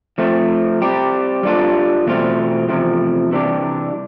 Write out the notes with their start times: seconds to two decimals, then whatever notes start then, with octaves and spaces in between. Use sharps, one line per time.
0.18 F3 A3 C4
0.82 G3 C4 G4
1.43 G3 D4 F4 A4
2.06 E2 B2 A3 C4 F4
2.68 E2 C3 F3 A3 C4
3.31 C3 E3 G3 D4 G4